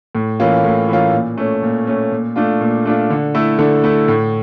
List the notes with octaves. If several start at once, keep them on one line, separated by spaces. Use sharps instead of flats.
A2
E3 A#3 C#4 F4
A2
E3 A#3 C#4 F4
A#2
A3 C#4
A#2
A3 C#4
A#2
A3 D4 F4
A#2
A3 D4 F4
D3
A3 E4
D3
A3 E4
A2